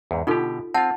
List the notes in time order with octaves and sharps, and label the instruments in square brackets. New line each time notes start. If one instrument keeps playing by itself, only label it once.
[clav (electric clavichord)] E2 G#2
[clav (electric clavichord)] B2 D3 G4 [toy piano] D#4 F4 A4
[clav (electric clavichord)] C4 F4 [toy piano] F#5 A5